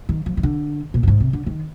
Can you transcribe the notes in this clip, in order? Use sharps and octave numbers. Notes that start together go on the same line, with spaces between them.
D#3
F3
D#3
D3
A#2
G2
G#2
C3
D3
D#3